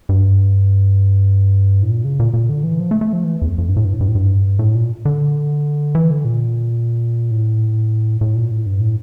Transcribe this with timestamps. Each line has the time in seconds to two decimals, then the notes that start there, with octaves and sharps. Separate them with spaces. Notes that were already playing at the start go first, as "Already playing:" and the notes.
0.09 G2
1.82 A2
1.90 A#2
2.05 C#3
2.20 A#2
2.34 A#2
2.49 D3
2.64 E3
2.80 F3
2.91 A3
3.01 A3
3.13 F3
3.24 E3
3.42 E2
3.47 F2
3.58 F2
3.69 G2
3.77 A2
3.85 G2
3.93 A2
4.01 G2
4.08 A2
4.15 G2
4.59 A2
4.75 A#2
5.05 D3
5.95 E3
6.11 D3
6.25 A#2
7.31 A2
8.21 A2
8.36 A#2
8.51 A2
8.66 G2
8.80 A2